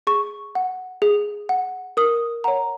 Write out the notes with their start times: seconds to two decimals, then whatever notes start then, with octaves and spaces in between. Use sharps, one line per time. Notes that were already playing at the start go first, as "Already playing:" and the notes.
0.07 G#4 C#6
0.55 F#5
1.02 G#4
1.49 F#5
1.97 A#4 D#6
2.44 C#5 F#5 A#5